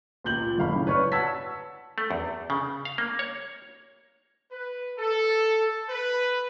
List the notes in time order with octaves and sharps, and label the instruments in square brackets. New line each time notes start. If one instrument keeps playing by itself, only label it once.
[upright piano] C#2 A#2 G6 F#7
F#1 F5 B5
A2 C#3
B4 C#5 D5 C#6 F6
F#5 A5 E6 G#6 B6
[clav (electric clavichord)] A3
E2
C#3
F5
A#3
C#5
[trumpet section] B4
A4
B4